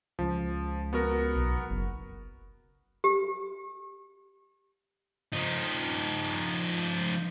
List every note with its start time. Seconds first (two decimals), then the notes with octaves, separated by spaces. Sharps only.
0.19 C#2 F3
0.93 B3 F#4 A#4
1.35 B1
1.70 F#1
3.04 G4
5.33 F3 D#4